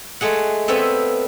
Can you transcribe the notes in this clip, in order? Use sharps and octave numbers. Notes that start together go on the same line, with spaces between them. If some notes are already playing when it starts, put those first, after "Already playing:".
G#3 A3 G#4 F#5
B3 C4 A4 B4 C#5 E5